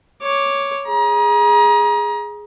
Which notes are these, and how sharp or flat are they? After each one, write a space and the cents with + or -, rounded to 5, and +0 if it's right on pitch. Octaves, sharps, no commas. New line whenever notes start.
C#5 +0 D6 +0
G#4 +0 A#5 +35